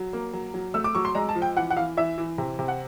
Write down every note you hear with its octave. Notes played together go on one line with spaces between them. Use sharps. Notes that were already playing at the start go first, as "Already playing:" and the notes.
Already playing: F#3
A#3
F#3
F#3
A3 E6
D6
F#3 C#6
C6
G#3 A#5
A5
F3
G5
E3 F#5
F#5
E3 F5
E3 E5
E3
C3
C3
F#5